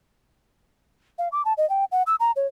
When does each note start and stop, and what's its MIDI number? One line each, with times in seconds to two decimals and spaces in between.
1.18 1.29 77
1.32 1.42 86
1.45 1.53 81
1.57 1.68 75
1.70 1.85 79
1.92 2.03 78
2.07 2.16 88
2.20 2.32 82
2.36 2.47 73